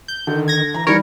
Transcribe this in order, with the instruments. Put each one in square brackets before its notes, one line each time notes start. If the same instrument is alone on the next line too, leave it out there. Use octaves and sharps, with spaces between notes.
[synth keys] G6
[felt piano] D3 [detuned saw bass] D#3
[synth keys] G#6 A#6
[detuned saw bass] E3 [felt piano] A#5
[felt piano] D#3 G3 [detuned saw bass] E3 [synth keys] A#4 C#5